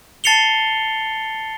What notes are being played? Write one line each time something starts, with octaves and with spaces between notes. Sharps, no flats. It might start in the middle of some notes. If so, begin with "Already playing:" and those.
A5 A6 C7 C#7 F7 G7